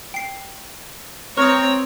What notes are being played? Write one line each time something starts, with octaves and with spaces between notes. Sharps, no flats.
G5 C7
C4 B4 C#5 A#5 C#6 D#6